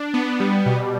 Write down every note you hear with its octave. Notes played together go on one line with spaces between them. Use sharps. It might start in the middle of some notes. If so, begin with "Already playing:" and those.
Already playing: D4
B3
G3
B2